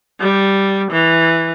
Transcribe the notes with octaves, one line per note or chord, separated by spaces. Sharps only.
G3
E3